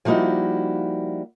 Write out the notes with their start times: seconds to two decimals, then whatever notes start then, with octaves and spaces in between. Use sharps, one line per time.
0.05 F3 G3 A#3 D#4 E4 F#4